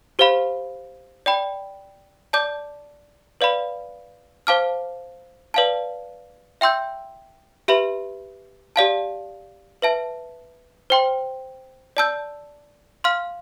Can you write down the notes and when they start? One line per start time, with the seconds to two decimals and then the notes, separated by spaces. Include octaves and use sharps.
0.19 G4 C5 F5 B5
1.26 D5 G5 B5
2.33 D5 A5 D6 G6
3.41 B4 D5 F5 B5
4.47 C5 F5 A5 D6 F6
5.54 B4 D5 F5 A5
6.61 E5 G5 C6 E6 G6
7.68 G4 B4 E5 B5
8.76 G4 D5 F5 A5
9.82 B4 E5 A5
10.90 C5 G5 C6
11.97 D5 A5 E6 G6
13.04 F5 C6 F6